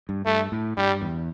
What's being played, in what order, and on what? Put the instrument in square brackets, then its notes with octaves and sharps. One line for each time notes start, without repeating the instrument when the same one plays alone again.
[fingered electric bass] G2
[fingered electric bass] G2 [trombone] A3
[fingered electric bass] A2
[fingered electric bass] G2 [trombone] G3
[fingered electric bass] E2